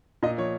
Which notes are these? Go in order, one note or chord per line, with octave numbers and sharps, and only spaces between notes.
A#2 D#5
F3 C#5